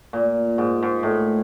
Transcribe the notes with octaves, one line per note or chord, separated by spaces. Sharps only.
A#2
G#2
G#2
A2